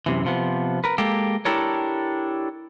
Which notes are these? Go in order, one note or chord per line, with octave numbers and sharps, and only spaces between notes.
F#2 C3 E3
C3 F3 B3
A#4 B4
G#3 A#3 G4 A4
D4 E4 G4 A4 A#4 C#5